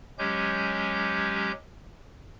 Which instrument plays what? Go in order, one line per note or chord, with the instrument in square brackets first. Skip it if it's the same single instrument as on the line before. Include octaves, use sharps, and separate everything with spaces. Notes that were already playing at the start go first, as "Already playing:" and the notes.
[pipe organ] F#3 G#3 C#4 G4 G6